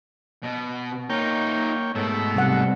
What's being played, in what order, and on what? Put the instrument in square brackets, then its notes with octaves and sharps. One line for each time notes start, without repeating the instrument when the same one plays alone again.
[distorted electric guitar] B2
[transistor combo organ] A#3 C#5 G5 [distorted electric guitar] D#4 F4
[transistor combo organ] G#2 A3 E6 [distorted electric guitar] B2 B3
[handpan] C3 G3 F#5